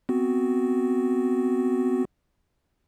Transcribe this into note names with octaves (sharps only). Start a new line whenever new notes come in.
B3 C4 F#4